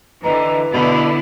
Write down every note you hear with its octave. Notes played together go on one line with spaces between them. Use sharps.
D3 E3 B4 D#5 A#5
B2 D3 B3 E4 B5